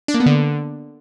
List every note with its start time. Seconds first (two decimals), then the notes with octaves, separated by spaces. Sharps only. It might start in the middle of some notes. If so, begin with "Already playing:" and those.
0.08 D4
0.14 A#3
0.20 B3
0.26 D3